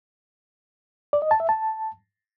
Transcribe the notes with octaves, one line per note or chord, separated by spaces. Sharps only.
D5
D#5
A5
E5
A5